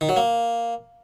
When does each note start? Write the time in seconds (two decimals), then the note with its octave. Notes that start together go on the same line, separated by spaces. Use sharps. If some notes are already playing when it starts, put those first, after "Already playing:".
0.01 D#3
0.09 F#3
0.17 A#3